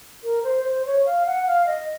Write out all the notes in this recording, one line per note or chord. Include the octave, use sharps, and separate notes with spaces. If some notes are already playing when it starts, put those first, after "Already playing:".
A#4
C5
C5
C#5
F5
F#5
F5
D#5